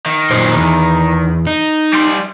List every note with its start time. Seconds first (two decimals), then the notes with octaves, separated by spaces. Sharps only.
0.06 D#3
0.31 F#2 A#2 C5
0.55 E2
1.47 D#4
1.93 G3 C6